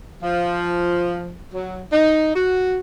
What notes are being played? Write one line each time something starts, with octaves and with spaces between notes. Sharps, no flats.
F3
F#3
D#4
F#4